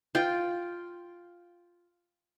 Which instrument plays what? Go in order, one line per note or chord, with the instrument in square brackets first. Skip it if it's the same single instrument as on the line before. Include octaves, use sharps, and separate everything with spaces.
[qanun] F4 G5